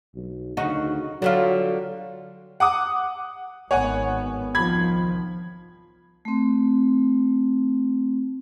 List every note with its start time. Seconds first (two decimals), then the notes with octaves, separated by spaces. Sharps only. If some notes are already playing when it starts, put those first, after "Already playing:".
0.15 B1
0.57 D2 C#3 D#4 F#4
1.22 D3 F#3 G3 F4
2.60 F#5 D6 D#6
3.71 G#1 D#3 B3 C#5 F#5 G#5
4.55 C2 D#3 F3 B5 G#6
6.25 A3 C4